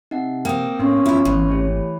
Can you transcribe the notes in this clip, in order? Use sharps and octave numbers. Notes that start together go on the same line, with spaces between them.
C3 D#4 E5 F#5
A#3 C4 G5 D#6
A2 B3 C#4 C6 D#6
F#2 E4 F4
G#1 E3
A3 G4 C#5